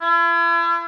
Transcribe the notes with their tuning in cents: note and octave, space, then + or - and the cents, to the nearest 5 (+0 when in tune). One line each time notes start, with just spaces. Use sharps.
E4 +40